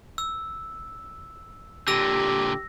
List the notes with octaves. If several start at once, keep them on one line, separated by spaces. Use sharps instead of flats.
E6
A#2 D3 G4 E6 A#6